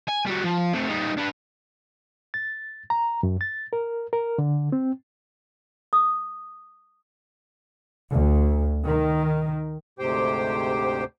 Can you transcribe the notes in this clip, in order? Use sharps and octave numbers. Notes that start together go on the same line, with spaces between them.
G#5
G3 F#4
F3
A3 C4
G3 D#4
D4 B4
A6
A#5
F#2
A6
A#4
A#4
D3
C4
D#6
D2
D#3
D2 G#2 C3 G4 C5 G5